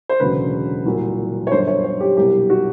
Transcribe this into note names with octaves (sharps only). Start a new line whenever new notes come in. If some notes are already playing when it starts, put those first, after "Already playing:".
C5
E1 D2 C#3 F#3 B4
C2 A#2 F#3
C#5
G1 F#2 D3 C5
C#5
C#5
G4
C2 B2 F#3 G4
F#4